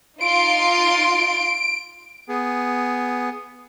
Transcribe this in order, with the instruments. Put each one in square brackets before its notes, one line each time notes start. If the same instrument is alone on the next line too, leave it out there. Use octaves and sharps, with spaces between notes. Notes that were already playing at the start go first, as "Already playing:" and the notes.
[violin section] D#4 F4 C6 [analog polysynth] D7
[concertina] B3 G#4